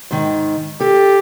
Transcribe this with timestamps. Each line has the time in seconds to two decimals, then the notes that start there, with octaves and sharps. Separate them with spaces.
0.11 G#2 D#3
0.80 G4 A4